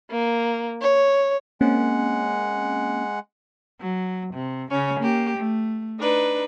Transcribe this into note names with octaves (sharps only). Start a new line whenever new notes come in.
A#3
C#5
G#3 A#3 C4 C#4 F#5
F#3
C3
C#3 C#4
A#3 G4
A3
D4 D#4 B4